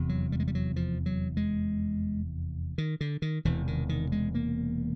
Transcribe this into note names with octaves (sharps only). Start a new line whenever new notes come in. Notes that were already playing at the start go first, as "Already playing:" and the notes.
Already playing: F1 E2 C3
F#3
G3
G#3
G3
F#3
F3
F#3
G#3
D#3
D3
D#3
E1 E2 C3 E3
D#3
D#3
G#3
A#3